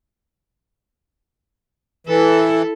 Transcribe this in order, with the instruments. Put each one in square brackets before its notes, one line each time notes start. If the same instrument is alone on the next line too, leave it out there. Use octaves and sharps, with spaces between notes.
[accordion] E3 [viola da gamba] E4 A4